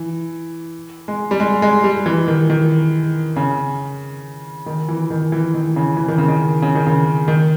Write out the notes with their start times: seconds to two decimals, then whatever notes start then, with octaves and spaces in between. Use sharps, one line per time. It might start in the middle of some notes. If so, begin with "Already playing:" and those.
Already playing: E3
1.08 G#3
1.31 G3
1.40 G#3
1.62 G#3
1.84 G3
2.06 E3
2.28 D#3
2.50 D#3
3.36 C#3
4.66 D#3
4.89 E3
5.10 D#3
5.32 E3
5.54 D#3
5.76 C#3
5.97 E3
6.08 D#3
6.18 C#3
6.28 D#3
6.62 C#3
6.75 D#3
6.87 C#3
7.28 D#3